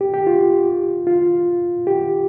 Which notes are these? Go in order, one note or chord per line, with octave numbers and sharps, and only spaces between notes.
G4
G4
F4
F4
G4